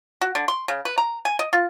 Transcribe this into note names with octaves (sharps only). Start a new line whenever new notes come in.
F#4
D3
C6
C#3
B4
A#5
G#5
D#5
F4